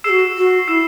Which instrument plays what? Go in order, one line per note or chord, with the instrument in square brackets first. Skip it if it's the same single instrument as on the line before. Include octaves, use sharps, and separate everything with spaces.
[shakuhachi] G#4 [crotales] E6 C7 E7
[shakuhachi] F#4
F#4
[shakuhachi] E4 [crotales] E6 C7 E7